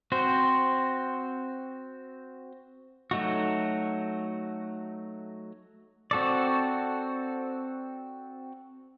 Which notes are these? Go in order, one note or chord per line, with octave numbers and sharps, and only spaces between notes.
C4 F#4 C5
F#3 A3 D#4 F#4
C4 F#4 A4 D5